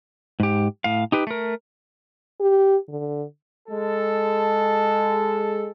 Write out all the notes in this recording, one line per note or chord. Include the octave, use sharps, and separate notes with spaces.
G#2 G4
A2 F5
D#4 G4 B4
A3 A#4
G4
D3
G#3 A4